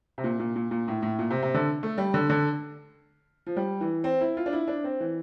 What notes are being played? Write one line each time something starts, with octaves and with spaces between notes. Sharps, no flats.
C3
A#2
A#2
A#2
A#2
A2
A2
A#2
C3
C3
D3
A3
G3
D3
D3
F3
G3
E3
C4
E4
F4
D4
E4
D4
C4
E3